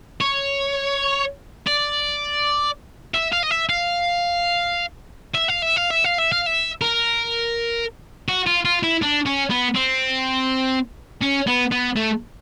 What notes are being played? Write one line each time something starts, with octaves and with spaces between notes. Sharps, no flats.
C#5
D5
E5
F5
D#5
E5
F5
E5
F5
E5
F5
E5
F5
E5
F5
E5
A#4
F#4
F4
F4
E4
D4
C#4
B3
C4
C#4
B3
B3
A3